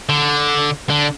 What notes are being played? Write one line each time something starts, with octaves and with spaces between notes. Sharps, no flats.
D3
D3